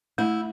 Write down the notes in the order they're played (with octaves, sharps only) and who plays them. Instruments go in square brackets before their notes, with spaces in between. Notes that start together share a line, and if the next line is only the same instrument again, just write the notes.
[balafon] A3 [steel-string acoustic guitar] E4